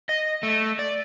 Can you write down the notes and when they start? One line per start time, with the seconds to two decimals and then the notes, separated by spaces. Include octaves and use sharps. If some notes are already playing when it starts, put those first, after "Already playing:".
0.09 D#5
0.43 A3
0.79 D5